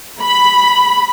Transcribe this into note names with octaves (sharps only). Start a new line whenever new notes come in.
B5